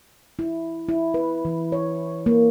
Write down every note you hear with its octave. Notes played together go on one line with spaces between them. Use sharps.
E4
E4
B4
E3
C#5
A#3